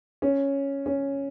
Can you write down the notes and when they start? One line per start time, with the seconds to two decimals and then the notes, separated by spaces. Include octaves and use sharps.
0.22 C#4
0.86 C#4